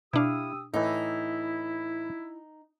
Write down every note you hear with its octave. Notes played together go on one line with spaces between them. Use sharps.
B2 D4 E4 G4 F5 D#6 E6
A2 E3 D#4 E4